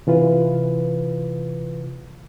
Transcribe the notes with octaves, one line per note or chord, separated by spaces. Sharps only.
C3 E3 F4 B4